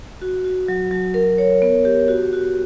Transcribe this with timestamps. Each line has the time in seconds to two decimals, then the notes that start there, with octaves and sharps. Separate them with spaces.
0.22 F#4
0.44 F#4
0.68 F#3
0.91 F#3
1.14 A#4
1.38 C#5
1.62 B3
1.85 G4
2.08 F#4
2.33 F#4